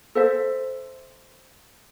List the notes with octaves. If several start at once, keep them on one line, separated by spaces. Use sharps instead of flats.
A4 C5 E5